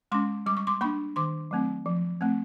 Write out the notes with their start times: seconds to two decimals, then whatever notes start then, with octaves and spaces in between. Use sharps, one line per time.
0.12 G#3 C#4 C6 D6
0.46 G3 D6
0.57 C#6
0.67 C6 D6
0.81 A#3 D4 B5 C#6
1.16 D#3 C6 D6
1.51 F#3 A3 C4
1.86 F3
2.21 A3 C4